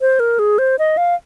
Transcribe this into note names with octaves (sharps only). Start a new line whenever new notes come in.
C5
A#4
G#4
C5
D#5
F5